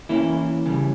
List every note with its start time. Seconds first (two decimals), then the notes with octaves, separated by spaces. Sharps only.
0.09 E3 A#3 C#4 E4
0.66 C#3 E3 G3